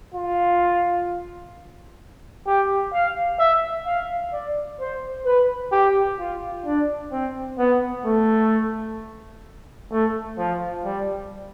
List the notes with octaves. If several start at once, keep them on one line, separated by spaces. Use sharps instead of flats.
F4
G4
F5
E5
F5
D5
C5
B4
G4
F4
D4
C4
B3
A3
A3
F3
G3